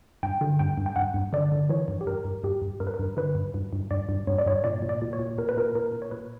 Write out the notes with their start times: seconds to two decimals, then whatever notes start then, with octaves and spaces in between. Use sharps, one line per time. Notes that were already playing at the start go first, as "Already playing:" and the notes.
0.23 G2 G5
0.41 D3
0.59 G2 G5
0.77 G2
0.86 G5
0.96 G2 F#5
1.14 G2
1.33 D3 D5
1.52 D3
1.69 E3 C#5
1.88 G2
2.01 G4
2.07 G2 A#4
2.25 G2
2.44 G2 G4
2.62 G2
2.80 G2 A#4
2.87 B4
2.94 A#4
2.99 G2
3.17 D3 B4
3.35 G2
3.54 G2
3.73 G2
3.91 G2 D5
4.09 G2
4.27 G2 C#5
4.38 D5
4.46 G2 C#5
4.64 A#2 D5
4.82 A#2
4.89 D5
5.02 A#2
5.13 C#5
5.19 A#2
5.38 A#2 A#4
5.49 B4
5.57 A#2 A#4
5.75 A#2 A#4
5.93 A#2
6.02 C#5
6.11 A#2 B4